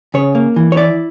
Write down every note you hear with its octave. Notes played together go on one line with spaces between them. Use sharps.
C#3 C#5
A#3
E3
C#5
E4 D5